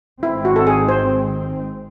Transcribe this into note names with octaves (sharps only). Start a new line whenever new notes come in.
G#1 G#2 D#3 G#3 C4 E4
F#4
A4
G#4
C5